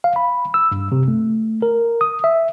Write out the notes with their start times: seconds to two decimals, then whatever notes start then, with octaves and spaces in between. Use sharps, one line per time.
0.04 F5
0.16 B5
0.54 E6
0.72 G2
0.92 C3
1.08 A3
1.62 A#4
2.01 D#6
2.24 E5